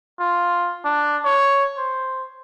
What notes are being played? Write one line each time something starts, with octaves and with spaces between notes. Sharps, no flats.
F4
D4
C#5
C5